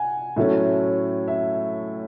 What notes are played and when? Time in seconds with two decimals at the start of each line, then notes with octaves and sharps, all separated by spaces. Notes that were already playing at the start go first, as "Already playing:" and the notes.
Already playing: F#5 G#5
0.36 A2 F#3 A3 C#4 E5
1.28 E5